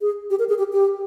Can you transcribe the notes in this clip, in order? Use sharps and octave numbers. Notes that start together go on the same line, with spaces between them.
G#4
G4
A#4
G#4
G4
G4